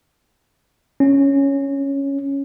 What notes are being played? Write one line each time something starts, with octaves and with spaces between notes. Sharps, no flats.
C#4